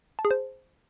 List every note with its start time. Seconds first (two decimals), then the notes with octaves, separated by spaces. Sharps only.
0.19 A5
0.25 G#4
0.31 C5